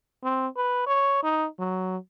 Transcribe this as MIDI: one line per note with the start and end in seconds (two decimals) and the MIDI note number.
0.24 0.47 60
0.57 0.86 71
0.87 1.23 73
1.23 1.47 63
1.59 1.97 54